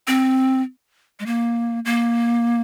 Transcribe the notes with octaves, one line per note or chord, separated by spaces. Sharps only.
C4
G#3
A#3
A#3